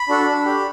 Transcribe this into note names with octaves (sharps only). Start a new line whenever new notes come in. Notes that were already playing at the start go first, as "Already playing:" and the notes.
Already playing: B5
D4 F#4 A4
D4
G4